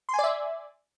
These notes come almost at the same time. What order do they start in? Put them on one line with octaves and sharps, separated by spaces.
C6 G#5 D5 E5